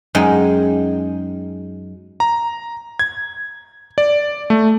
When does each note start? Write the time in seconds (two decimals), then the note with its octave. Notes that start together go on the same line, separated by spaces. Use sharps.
0.15 F#2 G#3 D#4 G5
2.20 A#5
2.99 G#6
3.98 D5
4.50 A3